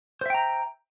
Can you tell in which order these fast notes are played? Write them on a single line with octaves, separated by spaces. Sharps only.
C5 E5 G5 A#5